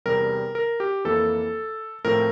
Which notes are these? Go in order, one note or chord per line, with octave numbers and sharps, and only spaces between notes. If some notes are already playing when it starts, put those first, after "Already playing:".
E2 C3 G3 A#4
A#4
G4
F2 E3 A#3 A4
A2 F3 C4 A#4